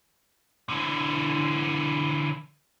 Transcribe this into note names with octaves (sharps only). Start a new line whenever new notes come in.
D3 E3